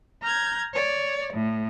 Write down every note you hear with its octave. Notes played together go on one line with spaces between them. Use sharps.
A#5 F6 G6 G#6
C#5 D5
A2